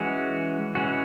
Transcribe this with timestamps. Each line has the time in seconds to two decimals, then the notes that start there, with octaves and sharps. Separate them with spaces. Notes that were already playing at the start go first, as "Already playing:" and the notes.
Already playing: E3 G#3 C#4 F#4
0.75 E3 G#3 C#4 F#4